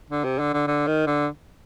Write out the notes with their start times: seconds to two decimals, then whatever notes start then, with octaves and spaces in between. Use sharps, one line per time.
0.10 D3
0.24 C3
0.39 D3
0.53 D3
0.67 D3
0.87 D#3
1.06 D3